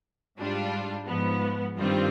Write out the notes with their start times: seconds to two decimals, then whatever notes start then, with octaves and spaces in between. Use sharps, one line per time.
0.37 G#2 G3 D4 F4
1.07 G#2 F3 B3
1.76 G2 D#3 G3 C4 F4